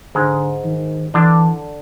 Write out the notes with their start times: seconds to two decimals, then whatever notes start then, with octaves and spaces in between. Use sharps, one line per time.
0.15 G#2 D3 G#3
0.64 D#3
1.14 D3 E3 D4